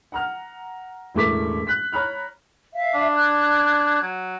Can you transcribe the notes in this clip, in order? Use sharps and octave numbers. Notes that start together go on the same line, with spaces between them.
F#5 A#5 F6
E1 A1 A3 A#4 D6 B6
F#6 B6
C#5 A#5 B5 F6
E5 F5
D4
F#6 G#6
F#3